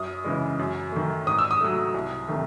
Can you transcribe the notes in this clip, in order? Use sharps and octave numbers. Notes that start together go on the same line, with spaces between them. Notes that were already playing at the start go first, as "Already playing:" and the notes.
Already playing: F#2 D#6
C#3 E3 G#3
F#2
D#3 A3
G#2 D#6
E6
D#6
F#3 A3
C2
C3 D#3 A3